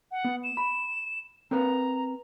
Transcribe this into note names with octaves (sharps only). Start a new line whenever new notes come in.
F#5
B3
E7
B5
C4 A#4 B4 A#5